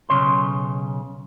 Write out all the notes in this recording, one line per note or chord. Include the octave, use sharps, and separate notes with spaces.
B1 G2 C#3 C#5 C6